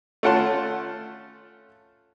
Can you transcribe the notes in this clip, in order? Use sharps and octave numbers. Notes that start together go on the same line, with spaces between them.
A3 C#4 F4 F#5 A5 C6